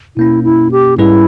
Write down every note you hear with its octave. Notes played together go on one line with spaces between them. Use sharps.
B2 A#3 C#4 E4
E4
G4
G#2 G3 C#4 E4 G#4 B4